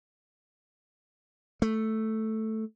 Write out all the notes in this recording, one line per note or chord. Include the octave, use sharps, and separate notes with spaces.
A3